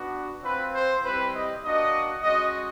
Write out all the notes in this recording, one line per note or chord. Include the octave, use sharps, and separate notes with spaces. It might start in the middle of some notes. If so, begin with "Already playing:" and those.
Already playing: B3 D4 F#4
C4 F4 B4
C5
G3 C4 E4 G4 B4
D#5
A#3 D4 F#4 D#5
G#3 C#4 F#4 D#5